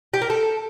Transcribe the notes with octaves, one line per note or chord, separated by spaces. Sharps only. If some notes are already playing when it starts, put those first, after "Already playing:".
G4
A#4
A4